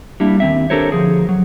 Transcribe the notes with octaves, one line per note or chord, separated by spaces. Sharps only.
G3 A#3 D4 E4
D#2 C4 E5
D4 G4 A4 A#4 C5 C#5
D2 F3 G#4
F#3